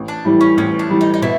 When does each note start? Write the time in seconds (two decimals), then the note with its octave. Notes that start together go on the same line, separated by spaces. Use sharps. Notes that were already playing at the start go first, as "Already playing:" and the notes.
Already playing: A1
0.08 D4
0.25 A2 E3 G3
0.41 C#4
0.57 A1 C#4
0.79 D4
0.90 A2 E3 G3
1.01 D#4
1.14 D#4
1.22 B2 E4